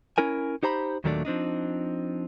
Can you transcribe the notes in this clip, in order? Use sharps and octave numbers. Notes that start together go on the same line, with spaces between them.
C#4 E4 A#4 G#5
D#4 G4 C5 A#5 B5
D#2 A#2 D#3 F#3 A3 D4
F3 C4 D4 D#4